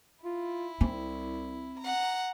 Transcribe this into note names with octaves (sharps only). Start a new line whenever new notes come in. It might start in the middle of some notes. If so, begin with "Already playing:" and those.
E4 F4
C2 C4
F#5 A#5